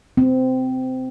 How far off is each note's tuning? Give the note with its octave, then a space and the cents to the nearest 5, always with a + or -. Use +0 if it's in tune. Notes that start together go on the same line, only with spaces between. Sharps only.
C4 -20